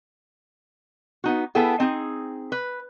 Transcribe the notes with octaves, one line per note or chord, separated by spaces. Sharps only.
B3 D#4 F#4
B3 E4 G#4 A4 G5
C4 D#4 G#4
B4